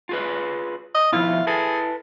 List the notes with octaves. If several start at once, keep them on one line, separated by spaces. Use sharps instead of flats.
F4 G#4 B4
D#5
B2 D#3 F3 E4 F4
G#4 A4 B4 A5